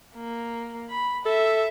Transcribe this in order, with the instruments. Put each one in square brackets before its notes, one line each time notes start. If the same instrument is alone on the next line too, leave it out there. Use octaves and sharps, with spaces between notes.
[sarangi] A#3
B5
[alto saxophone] A4 [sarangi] E5